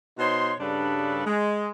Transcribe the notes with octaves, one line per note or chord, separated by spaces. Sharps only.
B2 D#4 C5 C#5 C6
G2 C#3 G3 D4 A4 B4
G#3